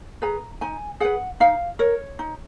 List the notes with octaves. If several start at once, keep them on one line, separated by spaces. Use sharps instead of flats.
G#4 B4 A#5
D#4 G#5
G#4 B4 F#5
D#4 F5
A#4 C#5
D#4